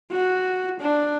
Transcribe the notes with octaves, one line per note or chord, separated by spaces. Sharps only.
F#4
D4